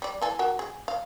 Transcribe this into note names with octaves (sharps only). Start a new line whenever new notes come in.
G3 D5
E3 A4 G#5
F#4 G4 A#4
G#4
F5